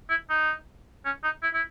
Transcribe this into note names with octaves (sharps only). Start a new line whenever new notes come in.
E4
D#4
C#4
D#4
E4
E4